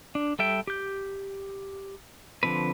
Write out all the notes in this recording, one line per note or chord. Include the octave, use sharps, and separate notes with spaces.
D4
G3 A4 E5 G5
G4 G6
D3 F3 C4 B4